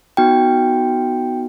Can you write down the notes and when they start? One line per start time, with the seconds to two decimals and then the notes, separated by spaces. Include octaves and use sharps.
0.17 B3 D#4 F#4 G5